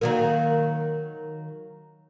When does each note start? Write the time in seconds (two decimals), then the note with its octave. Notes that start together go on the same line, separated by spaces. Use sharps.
0.01 D#3 F#3 A#3